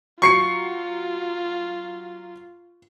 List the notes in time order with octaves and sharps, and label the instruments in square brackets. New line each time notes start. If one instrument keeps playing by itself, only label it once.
[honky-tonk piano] F#3 C7 C#7 [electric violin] F4 [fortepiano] C#6